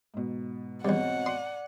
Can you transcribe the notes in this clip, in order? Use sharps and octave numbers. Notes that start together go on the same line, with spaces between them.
G#2 B2
E2 G2 C4 C#5 D#5 F#5
D5 C6